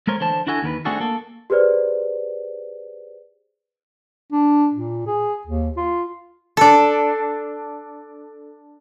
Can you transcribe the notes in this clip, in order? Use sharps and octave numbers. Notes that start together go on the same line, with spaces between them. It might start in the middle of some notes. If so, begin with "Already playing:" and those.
G#3 A3 A#4 C5 C#5
D3 E3 C5 A5
D4 E4 F#4 A4 G#5
D#2 D#3 A#4 B4
A3 C4 D4 F#4 G#4 A4
A#3 A4
G4 G#4 B4 C5 D5
D4
A#2
G#4
D#2
F4
D4 A4